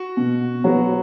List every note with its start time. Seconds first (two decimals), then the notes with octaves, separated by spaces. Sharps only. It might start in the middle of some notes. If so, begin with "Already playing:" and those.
Already playing: F#4
0.17 B2
0.64 F#3 B3 F#4